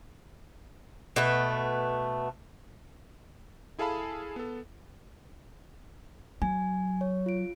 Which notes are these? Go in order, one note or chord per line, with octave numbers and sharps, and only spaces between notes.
B2 A3 B4
E4 G#4 A4 F5 A5 B5
B3 A4
F#3 G#5
C#5
F4 D7